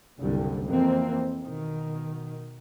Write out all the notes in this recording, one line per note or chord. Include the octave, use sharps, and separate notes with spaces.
F#1 C2 G2 D3 G3
F2 E3 A#3 C4
B2 D#3